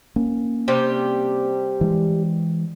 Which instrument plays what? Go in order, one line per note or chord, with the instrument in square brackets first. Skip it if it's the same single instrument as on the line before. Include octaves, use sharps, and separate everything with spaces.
[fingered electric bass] A#3 C#4
[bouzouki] C3 G3 G4
[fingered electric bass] E3 G#3